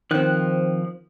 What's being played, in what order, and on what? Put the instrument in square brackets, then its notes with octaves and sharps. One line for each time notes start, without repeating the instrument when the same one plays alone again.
[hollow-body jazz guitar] D#3 C4 [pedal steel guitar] F3 F#6